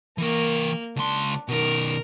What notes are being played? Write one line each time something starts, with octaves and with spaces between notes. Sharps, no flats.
E3 A#3 A#4
C#2 D4 C6
B2 D#3 A#4